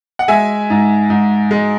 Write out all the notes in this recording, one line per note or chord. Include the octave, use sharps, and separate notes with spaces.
F#5
G#3 E5 G#5
G#2
G#2
G#3